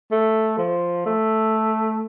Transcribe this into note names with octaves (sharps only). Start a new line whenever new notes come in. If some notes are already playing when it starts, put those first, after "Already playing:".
A3
F3
A3